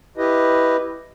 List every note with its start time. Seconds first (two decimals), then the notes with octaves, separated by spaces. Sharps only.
0.17 E4 G4 B4 D#5